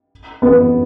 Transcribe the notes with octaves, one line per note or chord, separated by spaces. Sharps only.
B3